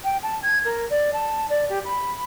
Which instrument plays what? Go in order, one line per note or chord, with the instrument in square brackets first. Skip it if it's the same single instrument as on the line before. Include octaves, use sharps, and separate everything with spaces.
[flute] G5
A5
G#6
A#4
D5
A5
D5
G4
B5